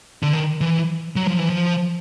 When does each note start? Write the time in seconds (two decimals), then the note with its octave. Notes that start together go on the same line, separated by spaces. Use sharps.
0.23 D3
0.33 D#3
0.61 E3
1.16 F#3
1.28 F3
1.39 E3
1.50 F3